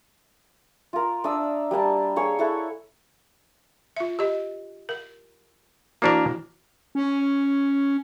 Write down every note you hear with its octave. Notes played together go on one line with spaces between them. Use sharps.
F4 A#4
D4 E5 D#6 E6
G3 A#3 D4 A5
A#3 G#4 C#5
E4 A4 F#5
F4 E5
G4 D#5
A#4
E3 A#3 D4 E4 F#4 A#4
C#4